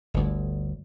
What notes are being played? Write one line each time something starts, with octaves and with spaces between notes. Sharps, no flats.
G1 D2